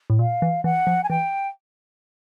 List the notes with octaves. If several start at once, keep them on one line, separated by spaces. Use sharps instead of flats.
A2
A#2 F5
E3
E3 F#5
F3
G#5
E3 G5